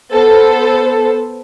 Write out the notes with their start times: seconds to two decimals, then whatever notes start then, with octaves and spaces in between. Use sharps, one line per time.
0.13 B3 A4 C5